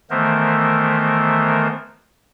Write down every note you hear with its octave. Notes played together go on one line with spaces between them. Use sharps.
D#3 E3 A3 B3 A#4 C5